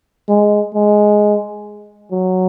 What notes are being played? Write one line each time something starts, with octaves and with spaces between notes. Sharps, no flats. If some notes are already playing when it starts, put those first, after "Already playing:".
G#3
G#3
F#3